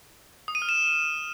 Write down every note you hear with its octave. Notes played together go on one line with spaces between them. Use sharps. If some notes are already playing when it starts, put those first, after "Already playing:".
D#6
D#7
F6
E7